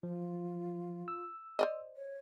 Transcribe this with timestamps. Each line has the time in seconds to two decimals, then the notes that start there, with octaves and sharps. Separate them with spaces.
0.03 F3 F4
1.08 E6
1.59 C5 D5 D#5
1.96 C#5